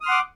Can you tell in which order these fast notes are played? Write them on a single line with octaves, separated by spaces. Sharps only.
D#6 F6 C6 F#5 D6